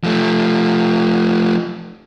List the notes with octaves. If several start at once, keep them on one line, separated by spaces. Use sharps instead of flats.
F3 A3